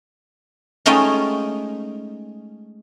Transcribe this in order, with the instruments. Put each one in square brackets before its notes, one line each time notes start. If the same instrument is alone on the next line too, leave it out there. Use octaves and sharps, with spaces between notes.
[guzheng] G#3 A3 C#4 D#4 F4 G5